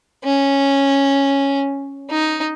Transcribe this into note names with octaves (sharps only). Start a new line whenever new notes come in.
C#4
D#4